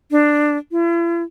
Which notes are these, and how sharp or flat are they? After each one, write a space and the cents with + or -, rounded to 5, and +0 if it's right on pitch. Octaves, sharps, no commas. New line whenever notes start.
D4 +10
E4 +45